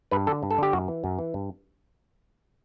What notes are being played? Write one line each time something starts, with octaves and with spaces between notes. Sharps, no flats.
G2 B4
D3 A4
G2
A4
D3 G4
F#2 F#4
E3
F#2
E3
G2